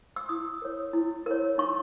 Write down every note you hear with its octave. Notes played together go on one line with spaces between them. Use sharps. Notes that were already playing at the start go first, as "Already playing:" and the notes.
E6
E4 D#6
A#4 C#5
E4
A#4 C#5
D#4 C#6